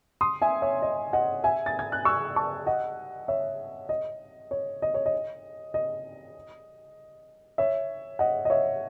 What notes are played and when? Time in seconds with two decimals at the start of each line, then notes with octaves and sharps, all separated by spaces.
0.21 C6 D#6
0.42 E5 G#5
0.62 C#5 E5
0.82 D#5
1.13 D#5 F#5
1.44 E5 G#5
1.66 A6
1.79 G#6
1.92 F#6
2.05 C#6 E6
2.36 A5 C#6
2.67 D#5 F#5
3.28 C#5 E5
3.89 D#5
4.51 C#5
4.82 D#5
4.94 C#5
5.06 D#5
5.74 D#5
7.58 C#5 E5
8.19 D#5 F#5
8.45 D#5
8.50 C#5 E5